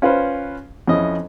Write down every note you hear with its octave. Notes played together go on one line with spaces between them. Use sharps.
C#4 F4 B4 C5
F2 C#4 E4 D#5